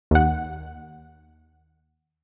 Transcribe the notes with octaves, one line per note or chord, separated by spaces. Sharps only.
D#2 F#5